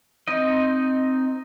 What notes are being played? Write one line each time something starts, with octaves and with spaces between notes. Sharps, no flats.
C4 D#4 D#5